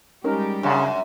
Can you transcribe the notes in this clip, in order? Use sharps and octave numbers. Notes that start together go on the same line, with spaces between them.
G3 G#3 C#4 D#4 G4 A#4
F#2 C#3 D4 F#5 A5